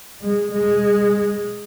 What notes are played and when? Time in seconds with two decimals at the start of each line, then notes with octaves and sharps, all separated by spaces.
0.21 G#3
0.52 G#3